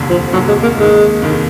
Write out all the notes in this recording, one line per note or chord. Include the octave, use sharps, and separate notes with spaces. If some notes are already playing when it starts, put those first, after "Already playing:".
Already playing: F1 D#2 D3
F3
F1 D#2 D3 F#3
G#3
A#3
F1 D#2 D#3 G#3
F1 D#2 D#3